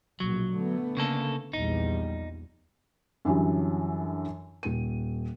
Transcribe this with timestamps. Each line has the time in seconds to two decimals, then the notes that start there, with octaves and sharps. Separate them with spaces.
0.20 A#1 B2 F#3
0.56 D3 A3 B3
0.97 C#3 A#3 A4
1.53 A#1 E2 G3 D#4
3.25 F#2 D3 E3 F#3 G3
4.63 D#1 D#7